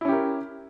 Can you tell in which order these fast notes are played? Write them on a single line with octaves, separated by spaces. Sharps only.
E4 C#4 G4 A#4